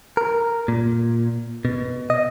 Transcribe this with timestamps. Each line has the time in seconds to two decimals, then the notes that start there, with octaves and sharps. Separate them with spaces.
0.17 A#4
0.68 A#2
1.65 B2
2.10 D#5